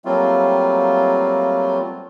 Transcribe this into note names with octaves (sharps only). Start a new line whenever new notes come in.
F#3 G3 A3 A#3 C4 F4